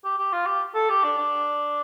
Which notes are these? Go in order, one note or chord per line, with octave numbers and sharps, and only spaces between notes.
G4
G4
F4
G4
A4
G4
D4
D4